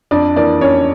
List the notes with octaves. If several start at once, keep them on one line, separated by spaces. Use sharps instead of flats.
F2 D4 D5
E3 A#3 D4 D5
F2 C#4 C#5